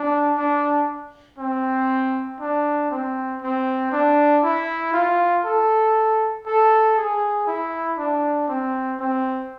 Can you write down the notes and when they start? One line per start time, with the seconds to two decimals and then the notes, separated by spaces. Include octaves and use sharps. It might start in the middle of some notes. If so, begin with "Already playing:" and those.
Already playing: D4
0.38 D4
1.38 C4
2.40 D4
2.91 C4
3.42 C4
3.92 D4
4.43 E4
4.93 F4
5.45 A4
6.46 A4
6.96 G#4
7.47 E4
7.98 D4
8.48 C4
9.00 C4